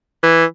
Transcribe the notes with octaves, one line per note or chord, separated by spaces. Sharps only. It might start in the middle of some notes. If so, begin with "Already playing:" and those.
E3